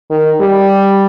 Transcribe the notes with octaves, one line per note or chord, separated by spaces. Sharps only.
D#3
G3